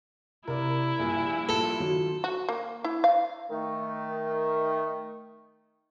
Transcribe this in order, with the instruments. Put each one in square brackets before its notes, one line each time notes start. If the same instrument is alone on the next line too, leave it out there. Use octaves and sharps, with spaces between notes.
[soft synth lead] C3 [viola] E4 [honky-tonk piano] A#4 D5
[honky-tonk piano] A#1 G2 A#2 [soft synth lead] G#5
[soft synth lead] F4 [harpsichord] A4
[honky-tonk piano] D#3 F#3
[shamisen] F#4
A#3
E4
F5
[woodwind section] D#3 A3